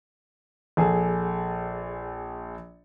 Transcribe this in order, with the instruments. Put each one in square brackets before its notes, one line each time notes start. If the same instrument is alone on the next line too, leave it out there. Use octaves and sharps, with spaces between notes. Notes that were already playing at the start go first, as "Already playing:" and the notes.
[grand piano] A#1 G#4 A4 A5